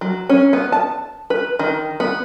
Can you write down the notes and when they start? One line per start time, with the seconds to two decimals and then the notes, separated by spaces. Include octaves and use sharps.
0.01 F#3
0.29 C#4
0.53 B3
0.72 A5
1.30 B4
1.59 D#3
2.00 B3